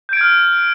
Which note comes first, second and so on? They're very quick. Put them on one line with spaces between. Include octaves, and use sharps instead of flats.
G6 D7 G#6 F6